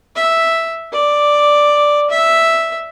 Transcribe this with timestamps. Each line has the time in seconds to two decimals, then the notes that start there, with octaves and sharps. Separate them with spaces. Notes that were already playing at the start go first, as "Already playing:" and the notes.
0.16 E5
0.93 D5
2.10 E5